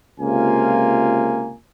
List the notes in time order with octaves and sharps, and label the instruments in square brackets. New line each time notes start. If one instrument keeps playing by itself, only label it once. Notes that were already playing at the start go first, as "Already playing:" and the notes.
[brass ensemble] C#2 C3 A#3 F4 G#5